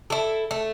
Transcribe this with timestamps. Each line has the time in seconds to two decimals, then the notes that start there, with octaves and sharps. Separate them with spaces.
0.10 E4 A4
0.51 A3